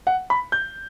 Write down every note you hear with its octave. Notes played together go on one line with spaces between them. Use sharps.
F#5
B5
G6